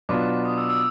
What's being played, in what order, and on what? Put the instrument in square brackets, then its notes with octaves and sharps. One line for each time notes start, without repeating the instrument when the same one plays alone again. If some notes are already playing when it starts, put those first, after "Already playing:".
[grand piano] B2 F#3 B3 D4 F4 [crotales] D6
[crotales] D#6
E6
E6